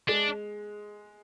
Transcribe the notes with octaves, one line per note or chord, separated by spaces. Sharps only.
G#3 D4